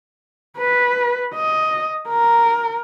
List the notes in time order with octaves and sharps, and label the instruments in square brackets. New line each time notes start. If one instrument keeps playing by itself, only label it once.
[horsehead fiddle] B4
D#5
A#4